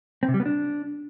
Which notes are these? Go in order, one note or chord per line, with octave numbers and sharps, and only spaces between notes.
C4
C3
G3
B3
D4